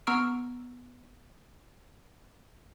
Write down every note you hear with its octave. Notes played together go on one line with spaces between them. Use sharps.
B3 A#5 C#6 E6 F6 D7